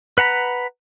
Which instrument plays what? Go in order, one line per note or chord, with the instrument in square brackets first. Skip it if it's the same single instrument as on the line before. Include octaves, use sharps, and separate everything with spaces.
[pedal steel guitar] B4 F#5 A#5 B5